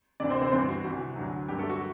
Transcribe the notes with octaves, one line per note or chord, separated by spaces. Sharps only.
D2 C3 E3 D4 D5
C4 C5
C4 C5
G2 E3 C4 C5
F#4
C2 C3 E3
D2 D3 F#3
G2 D3 F#3 G4
A3 A4
F#4